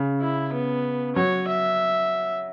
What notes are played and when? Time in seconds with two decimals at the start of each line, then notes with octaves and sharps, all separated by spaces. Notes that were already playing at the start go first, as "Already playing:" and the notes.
Already playing: C#3
0.21 E4
0.53 B3
1.16 F#3 C#5
1.48 E5